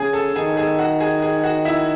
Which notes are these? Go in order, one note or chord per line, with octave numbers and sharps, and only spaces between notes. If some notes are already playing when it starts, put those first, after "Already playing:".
Already playing: C#3 G#4 G#5
A4 A5
D#3 G#4 G#5
G#4 G#5
F#4 F#5
G#4 G#5
G#4 G#5
F#4 F#5
E4 E5